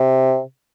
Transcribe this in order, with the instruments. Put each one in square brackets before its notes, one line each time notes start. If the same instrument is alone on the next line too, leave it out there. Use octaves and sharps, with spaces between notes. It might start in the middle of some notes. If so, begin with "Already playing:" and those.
Already playing: [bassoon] C3